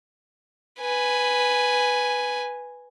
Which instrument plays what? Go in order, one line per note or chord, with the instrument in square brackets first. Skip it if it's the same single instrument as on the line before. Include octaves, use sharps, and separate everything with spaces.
[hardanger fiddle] B4 G#5